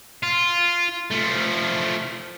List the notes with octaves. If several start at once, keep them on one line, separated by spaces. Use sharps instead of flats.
F4
F3 A3